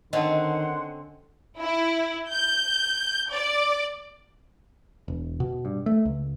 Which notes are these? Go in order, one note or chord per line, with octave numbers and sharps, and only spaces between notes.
D3 D#3 C4 C#4 D#5 F#5 A5 C6
E4
G6
D5
E1
B2
G2
A3
C#2